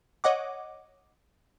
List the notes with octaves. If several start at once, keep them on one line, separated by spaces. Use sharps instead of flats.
C#5 D#5 F#5 D6